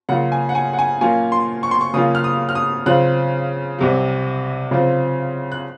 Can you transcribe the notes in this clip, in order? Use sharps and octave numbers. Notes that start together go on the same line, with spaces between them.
C#3 F#3 A#3 F4 F#5
G#5
F#5
G#5
F#5
G#5
A#2 F#3 A#3 C#4 F4 G#5
C6
C#6
C6
C#6
C#3 F#3 A#3 C#4 F4 D#6
F6
D#6
F6
D#6
C#3 F#3 C4 F4 F#6
C2 C3 F#3
C#3 F#3 C4 F4
F#6